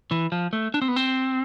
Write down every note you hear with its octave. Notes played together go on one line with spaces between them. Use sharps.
E3
F3
A3
D4
C4
B3
C4